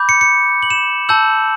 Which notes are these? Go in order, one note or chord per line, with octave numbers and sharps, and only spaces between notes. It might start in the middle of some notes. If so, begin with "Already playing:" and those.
Already playing: B5 D6 G6
C#7
C#7
F#7
E7
A5 E6 G6 F#7